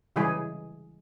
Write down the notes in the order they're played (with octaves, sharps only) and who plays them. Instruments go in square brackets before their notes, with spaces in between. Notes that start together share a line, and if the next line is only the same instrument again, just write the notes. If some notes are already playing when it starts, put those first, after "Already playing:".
[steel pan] C#3 E3 G3 G#3 E4 G#4